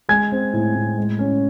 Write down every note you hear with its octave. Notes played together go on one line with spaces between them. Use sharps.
G#3 G#5 G#6
C4
A2
A2
G#3
C#4